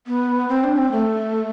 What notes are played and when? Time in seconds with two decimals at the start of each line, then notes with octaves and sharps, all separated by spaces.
0.07 B3
0.48 C4
0.64 D4
0.77 C4
0.92 A3